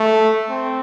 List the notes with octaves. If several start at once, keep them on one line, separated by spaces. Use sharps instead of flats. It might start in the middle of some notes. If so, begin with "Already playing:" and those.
Already playing: A3
C4